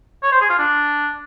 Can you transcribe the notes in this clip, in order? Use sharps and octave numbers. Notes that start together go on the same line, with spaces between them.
C#5
C5
G#4
F4
D4